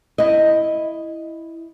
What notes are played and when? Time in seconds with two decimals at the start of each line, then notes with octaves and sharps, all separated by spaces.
0.18 E4 D#5